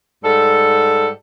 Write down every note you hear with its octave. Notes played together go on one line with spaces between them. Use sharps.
G#2 G3 A4